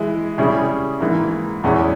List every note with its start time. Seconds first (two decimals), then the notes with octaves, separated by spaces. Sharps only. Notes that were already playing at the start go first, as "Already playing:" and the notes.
Already playing: E3 G#3 E4
0.38 C#3 G3 C#4 E4 G#4
1.00 G#2 E3 A#3
1.63 E2 E3 G#3 C#4